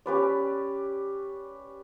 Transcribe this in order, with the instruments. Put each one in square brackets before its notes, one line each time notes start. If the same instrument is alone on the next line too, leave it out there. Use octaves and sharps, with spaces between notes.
[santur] C#4 G4 B4 D5